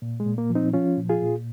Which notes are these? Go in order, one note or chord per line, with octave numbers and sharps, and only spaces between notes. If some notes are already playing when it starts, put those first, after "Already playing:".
A#2
G#3
A#2
A#3
F3
C4 D#4
F3 C#4 F4
A#2
F4 G#4
A#2